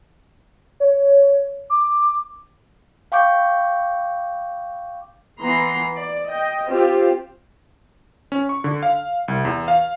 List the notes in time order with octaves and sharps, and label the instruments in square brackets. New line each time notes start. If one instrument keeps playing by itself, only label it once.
[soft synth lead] C#5
D6
[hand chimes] F5 G5 C#6 D6 G6
[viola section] E3 B3 A#5 C6
D5
D#5 G5
C4 F4 G4
[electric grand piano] C#4
C#6
D3
F5
C2
E2
F5